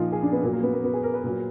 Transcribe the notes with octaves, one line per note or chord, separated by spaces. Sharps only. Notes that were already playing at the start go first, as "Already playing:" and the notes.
Already playing: A#2 F3 D#4 F4
G#4
D4
B3
A#2 F#3 A#3
A#3
B3
A#3
B3
G#4
A#4
B4
A#2 F#3